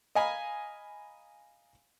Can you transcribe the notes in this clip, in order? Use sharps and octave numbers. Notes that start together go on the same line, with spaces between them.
D#5 F5 G#5 A#5 B5